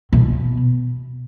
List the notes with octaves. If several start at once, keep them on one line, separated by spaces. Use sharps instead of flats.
B2